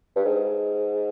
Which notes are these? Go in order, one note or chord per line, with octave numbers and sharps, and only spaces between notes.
G2
G#2